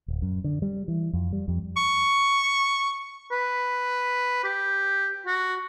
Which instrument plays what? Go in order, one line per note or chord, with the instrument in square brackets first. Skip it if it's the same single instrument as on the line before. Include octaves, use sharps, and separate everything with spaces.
[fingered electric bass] D1
F#2
D3
G3
E3
F2
G3
F2
[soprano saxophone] C#6
[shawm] B4
G4
F#4